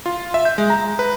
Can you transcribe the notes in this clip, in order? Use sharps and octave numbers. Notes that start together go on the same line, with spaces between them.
F4
E5
G6
G#3
A#5
B4